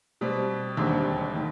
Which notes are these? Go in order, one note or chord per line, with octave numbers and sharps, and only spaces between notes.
B2 G3 C4
E1 D#2 D3 G3 C4
D#3